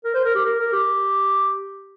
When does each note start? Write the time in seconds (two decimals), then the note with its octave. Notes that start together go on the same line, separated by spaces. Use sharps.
0.04 A#4
0.14 C5
0.25 A#4
0.35 G4
0.45 A#4
0.59 A#4
0.73 G4